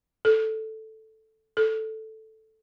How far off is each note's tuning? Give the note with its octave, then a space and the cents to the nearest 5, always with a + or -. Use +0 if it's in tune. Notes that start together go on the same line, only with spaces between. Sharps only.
A4 +0
A4 +0